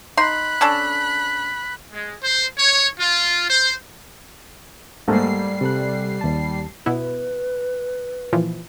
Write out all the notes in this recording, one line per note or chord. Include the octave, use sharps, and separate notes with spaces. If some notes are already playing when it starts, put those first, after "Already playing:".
D#4 B5 C6 F#6
C#4 D4 A4
G#3
C5
C#5
F4
C5
G#2 G3 A3 A#3 C7
C3 A4 F#6
D#2 A5
B2 B3 E4 B4
A#2 E3 F3